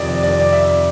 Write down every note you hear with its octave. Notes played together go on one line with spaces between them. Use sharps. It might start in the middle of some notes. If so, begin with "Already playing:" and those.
Already playing: F2 C3 D#3 D5 D#5
D5
E5